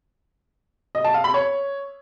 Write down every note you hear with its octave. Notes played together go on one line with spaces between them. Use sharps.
D#5
A5
F5
B5
C#5